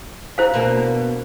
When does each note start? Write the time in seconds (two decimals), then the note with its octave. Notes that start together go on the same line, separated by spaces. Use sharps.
0.38 E4 C5 F5
0.54 B2 A#3 D4